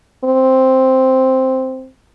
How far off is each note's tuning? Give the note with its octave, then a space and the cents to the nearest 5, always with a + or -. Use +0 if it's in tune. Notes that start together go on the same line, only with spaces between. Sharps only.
C4 +0